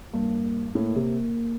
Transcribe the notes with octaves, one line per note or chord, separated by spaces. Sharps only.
G2 A#3
A2 A#3
C3